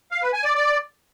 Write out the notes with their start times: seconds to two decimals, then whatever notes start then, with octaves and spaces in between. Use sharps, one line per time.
0.11 F5
0.22 B4
0.33 G#5
0.44 D5
0.55 D5